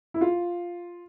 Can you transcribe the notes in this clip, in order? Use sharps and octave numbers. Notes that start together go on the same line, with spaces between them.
E4
F4